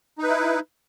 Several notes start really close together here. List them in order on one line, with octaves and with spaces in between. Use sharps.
D#4 B4 E4